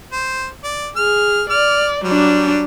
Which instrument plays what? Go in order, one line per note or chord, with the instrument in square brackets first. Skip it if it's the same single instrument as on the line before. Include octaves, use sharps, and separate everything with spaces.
[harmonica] C5
D5
[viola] G#4 [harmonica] F6
[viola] D5 [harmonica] F6
[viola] F#3 D4 [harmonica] G3